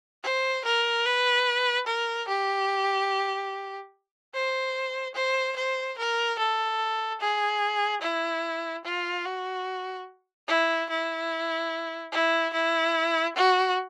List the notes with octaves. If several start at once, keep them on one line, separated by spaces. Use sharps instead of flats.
C5
A#4
B4
A#4
G4
C5
C5
C5
A#4
A4
G#4
E4
F4
F#4
E4
E4
E4
E4
F#4